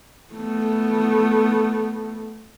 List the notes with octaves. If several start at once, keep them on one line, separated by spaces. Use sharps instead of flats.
A3 B3